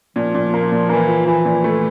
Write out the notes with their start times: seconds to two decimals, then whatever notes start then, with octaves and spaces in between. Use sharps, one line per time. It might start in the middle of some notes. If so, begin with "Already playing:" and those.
0.16 A#2 F3
0.35 A#2
0.54 A#3
0.72 A#2
0.89 E3 A#3
1.08 F3
1.26 E3 F3
1.45 A#2
1.64 A3